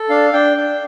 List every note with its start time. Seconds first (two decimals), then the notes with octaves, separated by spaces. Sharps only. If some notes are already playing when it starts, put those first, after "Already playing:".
Already playing: A4
0.09 D4 F5
0.33 D4 G5
0.57 D4